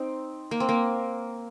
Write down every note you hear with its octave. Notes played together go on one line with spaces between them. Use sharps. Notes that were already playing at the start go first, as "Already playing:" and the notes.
Already playing: C4 D#4
A#3
C4
A#3